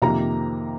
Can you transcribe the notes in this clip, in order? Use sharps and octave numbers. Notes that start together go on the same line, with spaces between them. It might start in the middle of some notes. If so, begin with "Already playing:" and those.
F2 C3 D#3 A#3 A#5